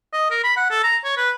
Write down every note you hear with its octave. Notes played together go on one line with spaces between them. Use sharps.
D#5
A#4
B5
F#5
A4
A#5
C#5
B4